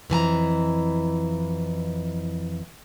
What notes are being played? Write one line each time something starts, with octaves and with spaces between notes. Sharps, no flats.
F2 E3 G#5 A#5